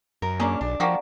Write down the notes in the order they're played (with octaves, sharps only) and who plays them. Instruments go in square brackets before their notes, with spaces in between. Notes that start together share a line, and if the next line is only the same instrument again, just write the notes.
[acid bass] F#2 [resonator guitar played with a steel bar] A#4
[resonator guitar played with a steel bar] A#3 C#4 D4 [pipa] G#4
[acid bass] B1 [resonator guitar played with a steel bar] D4
[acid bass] F3 [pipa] A#3 F#4 G4